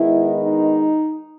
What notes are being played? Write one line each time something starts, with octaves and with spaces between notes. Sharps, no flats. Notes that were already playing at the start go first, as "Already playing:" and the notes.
Already playing: D#3 G#3 B3 E4
D#4